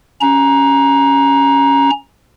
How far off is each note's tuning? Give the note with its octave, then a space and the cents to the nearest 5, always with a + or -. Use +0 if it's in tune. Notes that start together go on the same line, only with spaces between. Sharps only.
C#4 +0 A#5 +15